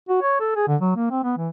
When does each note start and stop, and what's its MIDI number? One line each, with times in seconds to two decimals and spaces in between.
0.09 0.20 66
0.22 0.38 73
0.40 0.51 69
0.56 0.68 68
0.68 0.76 50
0.81 0.93 54
0.96 1.11 58
1.11 1.22 60
1.24 1.32 59
1.37 1.49 52